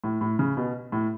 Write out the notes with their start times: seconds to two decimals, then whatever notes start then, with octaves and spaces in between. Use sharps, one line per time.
0.04 A2
0.21 A2
0.39 C#3
0.57 B2
0.92 A2